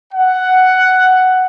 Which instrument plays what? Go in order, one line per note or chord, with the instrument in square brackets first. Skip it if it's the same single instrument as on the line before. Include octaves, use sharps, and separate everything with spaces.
[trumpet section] F#5